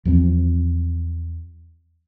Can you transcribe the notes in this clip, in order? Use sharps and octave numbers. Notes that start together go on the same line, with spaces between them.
E2 F3 B3 C4